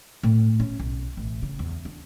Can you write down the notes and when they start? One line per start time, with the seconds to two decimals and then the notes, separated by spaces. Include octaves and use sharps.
0.23 A2
0.60 C#4
0.80 B1
1.17 A1
1.42 C#3
1.59 E2
1.85 D4